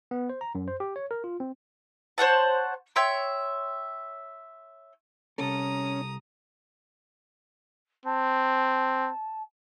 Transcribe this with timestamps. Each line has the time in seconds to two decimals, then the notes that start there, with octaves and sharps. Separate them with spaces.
0.11 B3
0.29 C5
0.41 A#5
0.55 F#2
0.68 C5
0.80 G4
0.96 C#5
1.11 A#4
1.24 F4
1.40 C4
2.18 C5 C#5 F#5 A5
2.96 C#5 E5 G5 C6
5.38 C2 C#4 A4 A#5 D#6
8.06 C4 A5